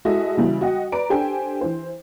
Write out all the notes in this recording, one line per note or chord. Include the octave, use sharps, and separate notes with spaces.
G#3 E4 F#4 A4 D#5 E5
C#3 E3 G3 E4 F#4
F#4 D#5 F#5 G5
B4 D5 A#5 D7
D4 G4 A4 C5 G5 G#5
E3 C5